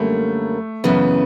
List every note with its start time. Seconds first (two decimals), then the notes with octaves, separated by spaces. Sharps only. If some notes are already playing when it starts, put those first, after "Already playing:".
Already playing: F#2 D3 G3 A3 A#3
0.84 F#2 C#3 E3 B3